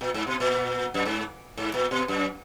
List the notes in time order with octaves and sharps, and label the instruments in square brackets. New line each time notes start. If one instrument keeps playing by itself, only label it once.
[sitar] A#2
G#2
B2
A#2
F#2
G#2
G#2
A#2
B2
F#2